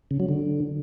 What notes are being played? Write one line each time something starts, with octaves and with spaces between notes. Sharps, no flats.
C#3
F#3
D3